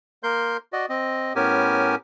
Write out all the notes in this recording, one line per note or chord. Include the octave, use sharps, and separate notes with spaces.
A#3 A#4 C6 G6
F#4 D5 D#5
C4 D#5
A2 B3 C#4 G4 A#4 G#5